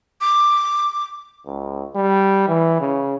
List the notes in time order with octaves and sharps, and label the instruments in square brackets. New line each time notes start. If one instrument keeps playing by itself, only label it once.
[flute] D6
[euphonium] C#2
G3
E3
C#3